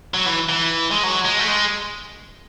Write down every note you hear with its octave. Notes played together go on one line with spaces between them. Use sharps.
F#3
E3
E3
G#3
F#3
G#3
A3
G#3